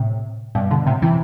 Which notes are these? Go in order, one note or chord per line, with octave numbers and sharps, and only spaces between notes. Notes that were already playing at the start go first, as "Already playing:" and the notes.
Already playing: A2 C3
G2 B2
B2 D3
A2 C3
C3 E3